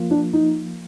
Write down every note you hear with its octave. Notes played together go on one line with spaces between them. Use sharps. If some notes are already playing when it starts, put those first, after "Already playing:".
Already playing: F3 A#3 F4
D4
D#4